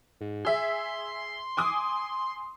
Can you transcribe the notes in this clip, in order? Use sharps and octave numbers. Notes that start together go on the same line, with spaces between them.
G#2
G#4 E5 C6
G#5 D6 D#6